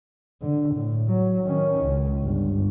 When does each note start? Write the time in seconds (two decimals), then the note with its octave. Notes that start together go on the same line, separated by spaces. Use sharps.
0.42 D3
0.74 A2
1.08 F#3
1.44 D#3 C#4
1.84 C#2
2.21 G1